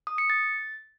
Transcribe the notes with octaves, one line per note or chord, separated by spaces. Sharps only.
D#6
C#7
A6